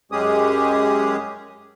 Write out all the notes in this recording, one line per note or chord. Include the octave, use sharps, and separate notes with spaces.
F#2 G#3 C#4 G4 G#4 D#6